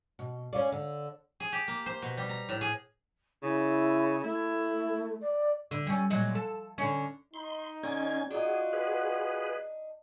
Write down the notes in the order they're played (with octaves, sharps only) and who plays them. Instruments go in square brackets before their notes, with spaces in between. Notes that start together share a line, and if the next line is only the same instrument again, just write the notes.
[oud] B2
C#4 F4 D5
D3
[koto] G#4
G4
A#3
C5
B2
G3
A#5
A2
G#4
[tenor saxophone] C#3 [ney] E4
[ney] A3 [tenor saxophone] E4
[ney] D5
[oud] D3
G3 C#4
A#2 F#3 G#3
A4
D3 C#4
[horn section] D#4 [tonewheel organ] C6
[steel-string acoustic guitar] D3 [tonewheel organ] C#4 G#6
[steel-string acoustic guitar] D4 D#4 [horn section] F4 F#4 F#5 [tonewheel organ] G#4
[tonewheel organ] G#4 B4